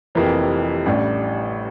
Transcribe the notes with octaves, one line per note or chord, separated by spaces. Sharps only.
F1 F2 C3 E3 A#3
A1 A2 G3 D4